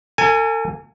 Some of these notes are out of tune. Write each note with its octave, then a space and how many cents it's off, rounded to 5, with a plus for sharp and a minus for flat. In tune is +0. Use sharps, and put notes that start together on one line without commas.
A4 +45 G#5 +0